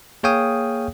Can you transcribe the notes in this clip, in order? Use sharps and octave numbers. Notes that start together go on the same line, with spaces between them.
A#3 G#4 C#5 F5 G5 D#6